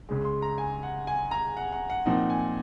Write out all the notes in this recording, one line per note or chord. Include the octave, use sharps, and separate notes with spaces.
C#2 C#3 G#3
C6
A#5
G#5
F#5
G#5
A#5
F#5
F#5
F#5
A#2 F3 C4 D#4 F#5
G#5